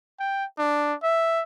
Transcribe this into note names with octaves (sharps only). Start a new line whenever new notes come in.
G5
D4
E5